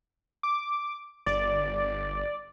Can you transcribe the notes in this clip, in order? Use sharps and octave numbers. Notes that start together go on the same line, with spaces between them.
D6
G1 D5